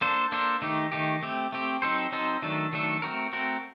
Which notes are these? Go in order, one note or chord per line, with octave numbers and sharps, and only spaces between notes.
A#3 D4 A4 C5
A#3 D4 A4 C5
D#3 A3 D#4 G4
D#3 A3 D#4 G4
A3 C4 G4
A3 C4 G4
F#3 C4 D#4 A4 C5
F#3 C4 D#4 A4 C5
D#3 F#3 A3 D4 A4
D#3 F#3 A3 D4 A4
A3 C4 F#4 A#4
A3 C4 F#4 A#4